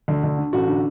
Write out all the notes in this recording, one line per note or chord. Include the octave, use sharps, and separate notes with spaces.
D2
D2
D3
A1 F#4
D3